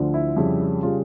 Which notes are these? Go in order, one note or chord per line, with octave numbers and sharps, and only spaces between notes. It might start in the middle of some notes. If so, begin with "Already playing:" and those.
Already playing: D2 D3 F3
E4
F2 C#3 G3
C#3 G3 F4